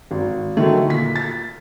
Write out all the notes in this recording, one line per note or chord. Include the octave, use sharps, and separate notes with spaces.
G#1
D3 D#3 F#3 A3
A#2 B6
A6